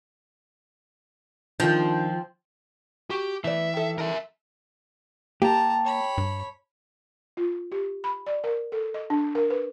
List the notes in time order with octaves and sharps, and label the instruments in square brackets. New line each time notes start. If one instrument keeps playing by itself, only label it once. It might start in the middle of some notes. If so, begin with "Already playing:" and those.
[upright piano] D#3 G6 [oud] F3 [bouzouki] C4 [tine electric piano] D4 F4
[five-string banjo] F#4 [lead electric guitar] G4
[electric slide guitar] E3 [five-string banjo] A3 B3 D5 [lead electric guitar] E5
[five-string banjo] D#3 A4
[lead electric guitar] A#4 E5
[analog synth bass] A#3 [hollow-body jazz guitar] G4 [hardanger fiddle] A5 A#5
[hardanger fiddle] C#5 B5
[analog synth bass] G2
[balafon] F4
G4
B5
D5
A#4
A4
D#5
D4
A#4
B4